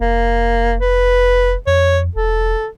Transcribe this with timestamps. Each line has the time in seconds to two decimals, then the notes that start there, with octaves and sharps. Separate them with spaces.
0.01 F1 A#3
0.80 B4
1.67 F2 C#5
2.16 E1 A4